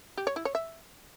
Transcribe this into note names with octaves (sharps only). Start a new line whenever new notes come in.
G4
C#5
E4
C#5
E5